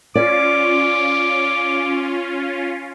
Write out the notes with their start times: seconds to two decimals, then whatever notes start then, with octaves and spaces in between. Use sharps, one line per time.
0.15 C#4 F4 D5 D6